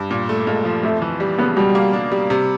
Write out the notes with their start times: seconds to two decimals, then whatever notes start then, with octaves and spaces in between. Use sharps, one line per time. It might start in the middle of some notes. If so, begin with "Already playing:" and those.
Already playing: G2
0.11 A#2
0.29 A3
0.47 A#2 G#3
0.65 F3
0.83 F2 A3
1.02 E3
1.20 G3
1.38 C#3 B3
1.56 B2 G3
1.75 A#3
1.93 D4
2.12 G3
2.30 C3